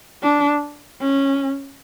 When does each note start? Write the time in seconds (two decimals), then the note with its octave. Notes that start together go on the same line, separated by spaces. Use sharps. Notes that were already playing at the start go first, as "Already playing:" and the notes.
0.23 D4
1.00 C#4